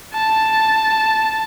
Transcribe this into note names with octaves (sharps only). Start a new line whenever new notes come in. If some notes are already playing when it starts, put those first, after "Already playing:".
A5